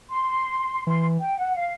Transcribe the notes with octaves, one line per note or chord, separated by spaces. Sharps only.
C6
E3 C6
G5
F#5
F5